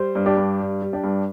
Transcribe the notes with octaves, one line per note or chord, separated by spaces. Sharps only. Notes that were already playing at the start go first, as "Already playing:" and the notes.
Already playing: G3 C5
G2
D4 G4
G2
G3
G3
D4 G4
G2